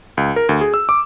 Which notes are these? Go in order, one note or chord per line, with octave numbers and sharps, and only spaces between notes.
C#2
A#4
D2
G#4
E6
D6